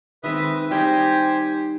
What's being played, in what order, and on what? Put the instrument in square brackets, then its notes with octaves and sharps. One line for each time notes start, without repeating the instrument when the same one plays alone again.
[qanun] D#3 G#3 C4 [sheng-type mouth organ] B4 E5 D#6
[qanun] G3 D#4 [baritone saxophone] G4 [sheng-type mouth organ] C5 G5 G#5